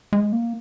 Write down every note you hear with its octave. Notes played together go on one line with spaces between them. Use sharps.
G#3
A#3